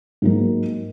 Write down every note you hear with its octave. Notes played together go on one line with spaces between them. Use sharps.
G#2 F#3 A#3